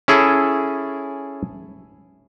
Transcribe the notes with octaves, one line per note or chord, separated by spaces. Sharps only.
C#4 E4 G#4 A4